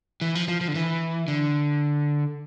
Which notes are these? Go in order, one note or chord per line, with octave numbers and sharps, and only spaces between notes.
E3
F3
F3
F3
D3
E3
D3